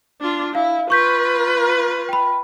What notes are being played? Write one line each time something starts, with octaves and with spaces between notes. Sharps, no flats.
D4 F4
E4 F5
F4 B4 C#6 G6 B6
G5 B5